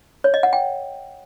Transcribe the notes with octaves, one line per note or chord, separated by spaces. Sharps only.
C#5
D#5
F#5
G5